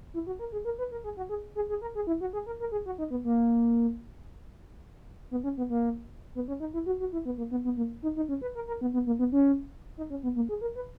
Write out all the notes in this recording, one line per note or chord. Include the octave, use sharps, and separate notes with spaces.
E4
F#4
A#4
G#4
A#4
B4
A#4
G#4
F#4
G#4
G#4
G#4
A#4
G#4
E4
F#4
G#4
A#4
A#4
G#4
F#4
D#4
B3
A#3
B3
C#4
B3
A#3
B3
C#4
D#4
E4
F#4
F#4
E4
B3
A#3
B3
B3
A#3
D#4
D#4
C#4
B4
A#4
A#4
B3
B3
A#3
B3
C#4
D#4
C#4
B3
A#3
G#4
A#4
B4